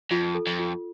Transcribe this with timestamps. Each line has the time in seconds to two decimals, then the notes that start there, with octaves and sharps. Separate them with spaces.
0.11 F2 F4
0.35 A4
0.47 F2
0.59 F4